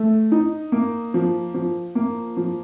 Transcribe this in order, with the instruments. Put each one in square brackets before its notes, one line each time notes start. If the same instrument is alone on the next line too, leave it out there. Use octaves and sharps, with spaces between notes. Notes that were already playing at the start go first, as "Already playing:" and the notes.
Already playing: [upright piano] A3
D#4
A#3
F3
F3
A#3
F3